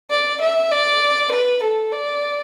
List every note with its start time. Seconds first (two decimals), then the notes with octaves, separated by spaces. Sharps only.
0.10 D5
0.41 E5
0.72 D5
1.32 B4
1.63 A4
1.92 D5